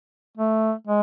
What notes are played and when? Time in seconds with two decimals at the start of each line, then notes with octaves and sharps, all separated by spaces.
0.37 A3
0.87 G#3